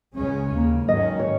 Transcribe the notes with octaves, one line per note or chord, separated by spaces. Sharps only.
C#2 C#3 G#3 C#4
D#2 C#3 A#3
G#2 D#3 F#3 C#4 D#5
C#5